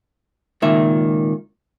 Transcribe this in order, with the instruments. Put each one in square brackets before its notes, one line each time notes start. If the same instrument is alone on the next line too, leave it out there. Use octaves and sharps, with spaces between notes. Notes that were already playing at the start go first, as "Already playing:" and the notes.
[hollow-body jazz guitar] C#2 A#2 D#3 E5